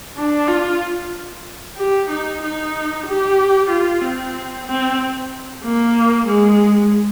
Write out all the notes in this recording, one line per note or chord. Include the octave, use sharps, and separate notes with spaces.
D4
F4
G4
D#4
D#4
G4
F4
C4
C4
A#3
G#3